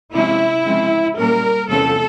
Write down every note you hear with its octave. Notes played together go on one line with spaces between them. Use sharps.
C3 F3 G#3 C#4 E4
C#3 F3 G#3 C4
A#2 G3 A#3 C#4 A#4
E2 C3 F3 A3 C#4 A4